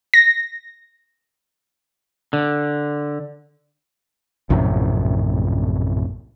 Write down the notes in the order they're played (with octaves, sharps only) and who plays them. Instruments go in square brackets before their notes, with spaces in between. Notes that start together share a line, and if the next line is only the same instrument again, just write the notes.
[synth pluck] A#6
[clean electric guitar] D3
[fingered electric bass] A#1 F#2 A2 C3